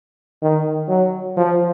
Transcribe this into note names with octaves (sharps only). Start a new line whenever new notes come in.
D#3
F#3
F3